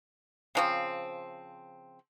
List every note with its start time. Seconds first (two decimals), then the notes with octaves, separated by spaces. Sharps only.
0.55 C#3 F3 C4